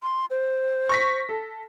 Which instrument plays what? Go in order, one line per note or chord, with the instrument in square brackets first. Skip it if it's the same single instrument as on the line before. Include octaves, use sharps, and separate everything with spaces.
[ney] C6
C5
[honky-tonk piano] C#6 A#6 B6
A4